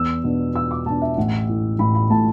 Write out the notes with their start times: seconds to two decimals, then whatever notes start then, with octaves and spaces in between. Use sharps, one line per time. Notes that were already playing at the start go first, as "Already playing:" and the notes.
Already playing: E2 E6
0.24 B2 B3 D4
0.55 E2 E6
0.71 D6
0.86 B2 B3 D4 A5
1.02 E5
1.17 A1 F#5
1.48 A2 A3
1.79 A1 B5
1.95 B5
2.10 A2 A3 A5